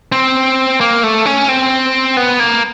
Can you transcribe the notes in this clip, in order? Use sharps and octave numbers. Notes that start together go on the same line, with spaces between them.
C4
A#3
A3
C#4
C4
B3
A#3